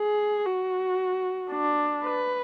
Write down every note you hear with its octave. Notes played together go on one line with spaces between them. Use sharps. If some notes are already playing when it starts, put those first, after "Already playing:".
Already playing: G#4
F#4
D4
B4